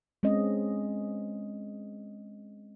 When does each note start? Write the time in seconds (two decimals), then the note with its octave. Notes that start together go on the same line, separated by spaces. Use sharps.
0.23 G#3 C4 C#4 D#5